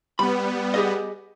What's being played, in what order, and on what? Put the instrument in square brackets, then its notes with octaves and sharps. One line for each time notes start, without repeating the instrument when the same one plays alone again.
[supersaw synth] G3 B3 [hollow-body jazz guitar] B5
[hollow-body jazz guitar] G4 G#4 D#5